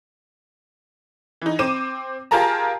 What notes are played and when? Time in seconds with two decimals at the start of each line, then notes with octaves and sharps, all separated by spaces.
1.42 E3 D#4
1.59 C4 D6 D#7 E7
2.31 F4 G4 G#4 A#4 A5 A#5